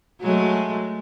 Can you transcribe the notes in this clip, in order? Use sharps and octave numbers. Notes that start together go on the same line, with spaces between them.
F#3 G#3 A3